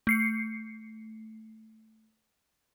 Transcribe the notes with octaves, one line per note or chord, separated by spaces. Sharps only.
A3 C7 C#7